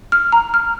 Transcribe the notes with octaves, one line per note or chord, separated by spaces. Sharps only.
F6
A#5
F6